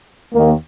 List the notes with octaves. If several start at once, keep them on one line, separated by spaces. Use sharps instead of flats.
D#2 D#3 A#3